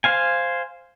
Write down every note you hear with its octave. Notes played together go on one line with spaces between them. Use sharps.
C5 F5 G#5